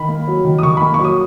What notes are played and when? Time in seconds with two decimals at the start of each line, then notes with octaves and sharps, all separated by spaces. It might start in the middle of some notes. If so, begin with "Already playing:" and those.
Already playing: D#3 B5
0.09 A#3
0.27 F#3
0.45 D#3
0.58 D#6
0.63 D#3 C#6
0.77 A#3 B5
0.94 C#6
0.99 F#3
1.04 D#6